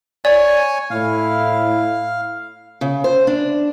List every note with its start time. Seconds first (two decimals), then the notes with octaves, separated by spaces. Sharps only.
0.25 C#5 D5 G#5
0.90 A2 E4 F5
2.81 C#3
3.04 C5
3.27 D4